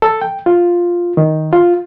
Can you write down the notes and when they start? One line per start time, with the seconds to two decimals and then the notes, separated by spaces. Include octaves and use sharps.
0.02 A4
0.21 G5
0.46 F4
1.17 D#3
1.53 F4